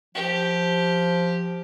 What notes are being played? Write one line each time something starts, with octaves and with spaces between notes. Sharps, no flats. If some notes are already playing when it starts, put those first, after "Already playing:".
F3 G4